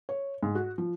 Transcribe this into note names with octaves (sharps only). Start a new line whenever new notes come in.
C#5
G#2
F#4
F3